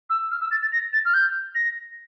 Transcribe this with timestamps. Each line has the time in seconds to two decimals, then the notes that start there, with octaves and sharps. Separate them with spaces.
0.10 E6
0.31 F6
0.41 E6
0.51 A6
0.62 A6
0.72 A#6
0.93 A6
1.05 F6
1.14 G6
1.55 A#6